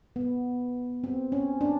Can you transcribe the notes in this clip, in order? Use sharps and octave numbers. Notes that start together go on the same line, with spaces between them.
B3
C4
C#4
D4